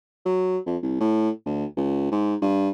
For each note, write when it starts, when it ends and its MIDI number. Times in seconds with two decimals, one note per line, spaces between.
0.25 0.58 54
0.66 0.77 41
0.82 0.96 36
1.00 1.30 45
1.46 1.65 38
1.77 2.08 37
2.11 2.36 44
2.42 2.70 43